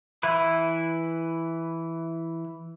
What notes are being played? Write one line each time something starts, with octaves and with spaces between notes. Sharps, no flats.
E3 E4 B4